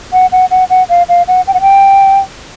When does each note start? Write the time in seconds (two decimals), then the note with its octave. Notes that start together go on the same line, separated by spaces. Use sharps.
0.13 F#5
0.32 F#5
0.51 F#5
0.70 F#5
0.89 F5
1.09 F5
1.28 F#5
1.47 G5
1.54 F#5
1.61 G5